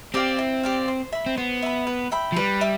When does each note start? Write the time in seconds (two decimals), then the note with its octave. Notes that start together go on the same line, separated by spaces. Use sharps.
0.14 C4 G4 D5 F5
0.38 E4
0.63 G4 D5 F5
0.88 C5
1.12 E5 B5
1.26 C4
1.37 B3 C5
1.62 E5 B5
1.87 B4
2.12 E5 G5 B5
2.32 F3
2.36 G3 B4
2.61 E5